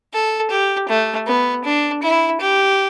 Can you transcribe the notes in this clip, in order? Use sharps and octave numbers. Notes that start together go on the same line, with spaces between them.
A4
G4
A3
B3
D4
E4
G4